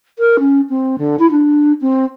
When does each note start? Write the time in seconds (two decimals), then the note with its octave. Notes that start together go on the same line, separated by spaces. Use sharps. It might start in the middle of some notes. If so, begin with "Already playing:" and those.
0.19 A#4
0.39 C#4
0.69 C4
0.98 D3
1.19 E4
1.31 D4
1.81 C4